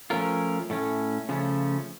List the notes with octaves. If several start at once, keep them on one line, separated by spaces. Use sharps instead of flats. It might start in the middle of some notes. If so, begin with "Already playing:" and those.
F3 A3 C#4 F4 A#4
A2 A3 C#4
C#3 F3 A3 C#4